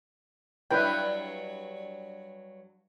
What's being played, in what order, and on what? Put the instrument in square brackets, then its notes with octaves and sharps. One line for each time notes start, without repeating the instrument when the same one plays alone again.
[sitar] G2 F#3 [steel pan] E4 B4 G5